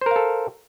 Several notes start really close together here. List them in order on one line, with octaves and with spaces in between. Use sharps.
C5 A#4 F5 A4